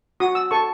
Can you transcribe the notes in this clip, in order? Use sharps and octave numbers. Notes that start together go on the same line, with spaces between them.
F#4 D#6
E6
A4 C#6